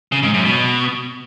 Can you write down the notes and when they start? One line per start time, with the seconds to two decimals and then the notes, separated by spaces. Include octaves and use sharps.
0.12 C#3
0.23 G#2
0.34 F#2
0.45 B2